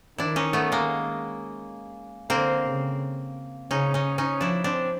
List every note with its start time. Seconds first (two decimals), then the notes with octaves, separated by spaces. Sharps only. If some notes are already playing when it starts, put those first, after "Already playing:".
0.18 D#3 D4 E4
0.36 C#4 D#4
0.53 A3 B3
0.72 G#3 A#3
2.30 D3 A#3 C4
2.65 C#3
3.70 C#3 C#4 D#4
3.94 C#4 D#4
4.18 C#4 D#4
4.41 F3 D4 E4
4.64 C4 D4